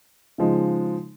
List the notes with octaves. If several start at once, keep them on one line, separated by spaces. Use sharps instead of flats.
C#3 F3 G#3 D#4